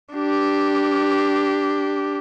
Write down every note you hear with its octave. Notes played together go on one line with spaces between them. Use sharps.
D4 G4